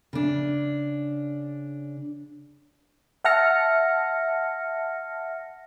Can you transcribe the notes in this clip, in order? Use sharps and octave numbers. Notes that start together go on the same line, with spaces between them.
C#3 D4
E5 F#5 A5 F6 A#6 C#7